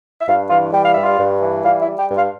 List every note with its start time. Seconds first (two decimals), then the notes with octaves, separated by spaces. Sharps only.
0.20 E5
0.27 G2 F4 F5
0.50 E3 F4 F5
0.72 G3 G5
0.83 F5
0.93 G2 E5
1.03 F4 F5
1.19 G2
1.42 E3
1.64 G3 F4 F5
1.81 E4 E5
1.87 G3
1.99 G4 G5
2.10 G2
2.16 F4 F5